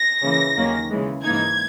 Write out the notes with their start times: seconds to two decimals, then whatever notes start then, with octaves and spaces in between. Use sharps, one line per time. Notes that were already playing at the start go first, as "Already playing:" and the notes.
Already playing: A#6
0.22 C#3 E3 A#3
0.57 D#2 D#3 F#3 A#3 C#4
0.91 C#3 E3 G#3
1.24 G#2 E3 A#3 D#4 G#6